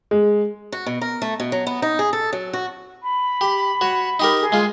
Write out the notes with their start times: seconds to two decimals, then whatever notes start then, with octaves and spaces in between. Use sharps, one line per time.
0.11 G#3
0.72 F#4
0.86 B2
1.01 A#4
1.22 A3
1.40 B2
1.52 F#3
1.67 B3
1.82 D#4
1.99 G#4
2.13 A4
2.33 F#3
2.53 F#4
3.02 B5
3.41 G4
3.81 F#4 C#5
4.20 D#4 G4 A#4
4.40 G#4
4.52 G#3 F4